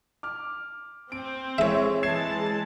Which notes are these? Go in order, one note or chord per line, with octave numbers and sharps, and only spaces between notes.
D6 F6
C4 D7
G#3 E4 A4 C#5 E5
E3 G#3 A5 G#6 C7 E7